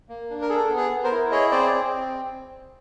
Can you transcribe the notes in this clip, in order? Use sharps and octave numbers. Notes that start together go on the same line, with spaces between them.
A#3
D4
A#4
G#4 A4
B3
G#4
B3
A#4 C5
E4
G#4 C#5 D#5
C4 C5 D5
C4